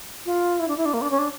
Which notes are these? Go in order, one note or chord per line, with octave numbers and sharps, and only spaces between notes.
F4
E4
D4
E4
D4
A#3
D4
C#4
D4